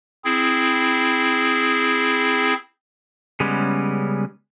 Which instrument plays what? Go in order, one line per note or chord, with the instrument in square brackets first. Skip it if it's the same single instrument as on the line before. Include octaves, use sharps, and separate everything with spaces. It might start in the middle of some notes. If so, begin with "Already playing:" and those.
[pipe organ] C4 E4 G#4
[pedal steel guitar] C#3 G3 G#3 B3 C#4